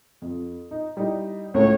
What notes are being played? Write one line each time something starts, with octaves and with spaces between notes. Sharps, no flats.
F2
D#4
G3 D#4 E4
C#2 A2 C#5